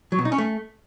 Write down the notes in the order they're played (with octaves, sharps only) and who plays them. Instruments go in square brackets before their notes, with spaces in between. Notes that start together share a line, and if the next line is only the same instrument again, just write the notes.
[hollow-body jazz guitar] F#3
B2
D#4
C#4
A3